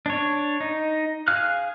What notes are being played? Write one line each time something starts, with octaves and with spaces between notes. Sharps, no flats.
D4 C#5
D#4
G#4 F5 F6 F#6